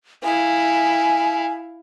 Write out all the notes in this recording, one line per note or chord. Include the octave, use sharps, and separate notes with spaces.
E4 F5 G#5